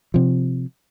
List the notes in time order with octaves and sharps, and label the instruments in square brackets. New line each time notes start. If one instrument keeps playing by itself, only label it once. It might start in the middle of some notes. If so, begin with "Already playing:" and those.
[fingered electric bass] C3 F3